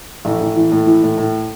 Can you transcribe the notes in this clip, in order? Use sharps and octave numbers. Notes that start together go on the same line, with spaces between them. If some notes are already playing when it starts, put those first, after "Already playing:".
A1
A1
E3
A2
E3
A2
A2